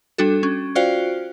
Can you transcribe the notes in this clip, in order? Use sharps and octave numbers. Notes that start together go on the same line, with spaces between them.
G3 D4 F#4 A4
C#4
F4 F#4 C5 D5 F5 G5